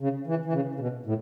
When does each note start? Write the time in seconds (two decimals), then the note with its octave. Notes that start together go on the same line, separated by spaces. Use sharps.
0.01 C#3
0.27 E3
0.46 E3
0.53 C#3
0.75 C#3
0.80 B2
1.06 A2